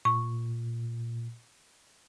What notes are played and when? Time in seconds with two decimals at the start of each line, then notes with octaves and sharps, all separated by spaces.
0.05 A#2 C#6